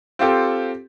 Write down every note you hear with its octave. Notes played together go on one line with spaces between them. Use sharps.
C4 F4 G4 A4